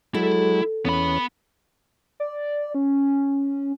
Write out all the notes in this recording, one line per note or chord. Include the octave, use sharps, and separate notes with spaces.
F#3 G#3 E4 A4
E2 B3 C#4 B5
D5
C#4